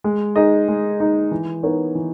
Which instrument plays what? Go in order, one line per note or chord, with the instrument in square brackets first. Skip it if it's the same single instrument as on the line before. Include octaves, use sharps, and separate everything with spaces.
[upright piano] G#3
D#4 G#4 D#5
G#3
D#4 G#4 D#5
E3
B3 D#4 A#4 C#5
E3